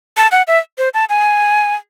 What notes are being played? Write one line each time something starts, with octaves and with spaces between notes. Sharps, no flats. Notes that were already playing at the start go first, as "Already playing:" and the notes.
A5
F#5
E5
C5
A5
G#5